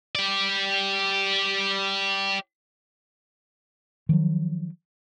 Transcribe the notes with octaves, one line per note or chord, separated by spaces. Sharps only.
G4 D5
D#3 F3 F#3